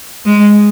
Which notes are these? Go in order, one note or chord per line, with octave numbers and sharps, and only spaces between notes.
G#3